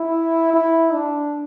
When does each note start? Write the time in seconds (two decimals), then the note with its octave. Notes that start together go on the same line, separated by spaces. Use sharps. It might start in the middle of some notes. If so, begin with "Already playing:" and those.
Already playing: E4
0.53 E4
0.94 D4